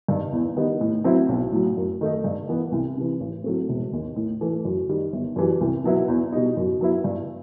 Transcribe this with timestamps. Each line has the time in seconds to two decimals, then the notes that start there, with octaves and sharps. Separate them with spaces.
0.08 G2 D#3
0.32 E2
0.56 D#3 G3 B3 D#4
0.81 A2
1.04 F#3 C4 E4
1.29 B1
1.52 A2 F#3
1.77 F#2
2.01 D#3 A3 D#4
2.24 G2
2.49 E3 B3
2.72 C2
2.97 C3 E3
3.21 A1
3.44 A2 F#3 A3 C4
3.69 E1
3.92 D#2 D#3
4.16 A2
4.41 E3 A3
4.65 F#2
4.89 D#3 G3 D#4
5.13 G1
5.36 F#2 E3 G3
5.61 C2
5.84 B2 F#3 B3 E4
6.08 E2
6.32 B2 G3 D#4
6.57 F#2
6.81 F#3 B3 E4
7.04 G2